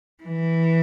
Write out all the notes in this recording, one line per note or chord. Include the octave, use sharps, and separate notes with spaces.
E3